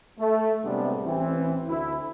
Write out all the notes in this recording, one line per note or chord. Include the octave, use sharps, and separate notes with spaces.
A3
A2 C3 G3 G#3 B3 D4
A1 E3 C4
D2 E4